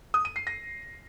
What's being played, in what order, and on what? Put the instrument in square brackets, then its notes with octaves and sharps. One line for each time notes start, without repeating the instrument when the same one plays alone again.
[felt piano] D#6
D#7
C7
A#6